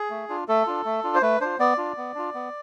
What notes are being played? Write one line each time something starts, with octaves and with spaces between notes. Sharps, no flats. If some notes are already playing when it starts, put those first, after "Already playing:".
Already playing: G#4
A3
D4 F4
A3 A4
D4 F4
A3
D4 F4
C5
A3 B4
D4 F4 C5
B3 D5
D4 F4
B3
D4 F4
B3